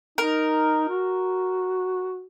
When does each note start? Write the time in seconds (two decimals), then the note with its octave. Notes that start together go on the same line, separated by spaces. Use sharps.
0.18 D#4 A#4
0.89 F#4